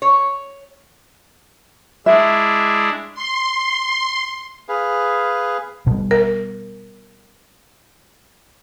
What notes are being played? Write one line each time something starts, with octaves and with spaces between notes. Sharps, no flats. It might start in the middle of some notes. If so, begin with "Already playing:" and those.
C#5
G#3 D4 E4 E5
C6
G#4 B4 F5
B2 G3
A#4